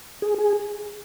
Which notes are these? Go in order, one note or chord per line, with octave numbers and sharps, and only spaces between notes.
G#4
G#4